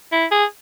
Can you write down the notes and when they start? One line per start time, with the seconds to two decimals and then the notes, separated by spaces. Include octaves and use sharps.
0.12 E4
0.31 G#4